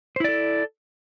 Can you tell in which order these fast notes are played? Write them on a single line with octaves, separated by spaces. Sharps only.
C5 E4 D5 A4